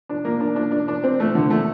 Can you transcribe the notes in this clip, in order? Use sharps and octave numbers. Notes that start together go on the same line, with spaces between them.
D4
A#3
D4
D4
D4
D4
C4
A3
D3
A3